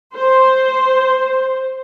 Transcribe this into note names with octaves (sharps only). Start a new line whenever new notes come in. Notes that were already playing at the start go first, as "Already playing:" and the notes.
C5